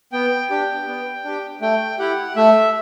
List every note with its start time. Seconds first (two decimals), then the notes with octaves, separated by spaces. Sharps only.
0.12 B3 G5
0.50 D4 G4
0.88 B3
1.24 D4 G4
1.62 A3 G5
1.99 E4 G4 F#5
2.36 A3 E5